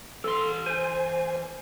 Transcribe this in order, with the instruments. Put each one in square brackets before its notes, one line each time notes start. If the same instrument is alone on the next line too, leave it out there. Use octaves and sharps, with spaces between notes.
[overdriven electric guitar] E3 C6 [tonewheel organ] A4
[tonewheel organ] C5 G#5